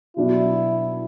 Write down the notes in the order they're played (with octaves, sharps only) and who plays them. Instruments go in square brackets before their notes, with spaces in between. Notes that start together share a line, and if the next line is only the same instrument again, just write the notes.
[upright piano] B2 F#3 B3 D4 [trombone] E4